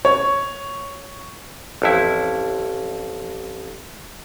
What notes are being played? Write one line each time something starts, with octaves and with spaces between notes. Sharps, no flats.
C#5
A1 F2 E4